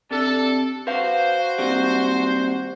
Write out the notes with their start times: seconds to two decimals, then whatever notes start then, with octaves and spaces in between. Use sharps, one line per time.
0.11 C3 D4 A4
0.87 F#4 B4 C5 F5
1.58 D#2 C3 G3